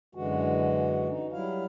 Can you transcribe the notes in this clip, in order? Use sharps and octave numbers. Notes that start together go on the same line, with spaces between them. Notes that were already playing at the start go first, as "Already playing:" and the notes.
F#2 D3 E3 G#3 F#4
D#4
F#3 G3 E4 F5